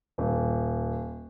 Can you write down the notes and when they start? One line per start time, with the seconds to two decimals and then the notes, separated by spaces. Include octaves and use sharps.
0.18 D#1